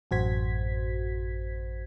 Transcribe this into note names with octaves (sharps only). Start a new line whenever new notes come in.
A1 F#2 F#4 C5 G#6 B6